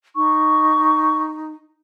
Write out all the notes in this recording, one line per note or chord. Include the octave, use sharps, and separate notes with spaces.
D#4 C#6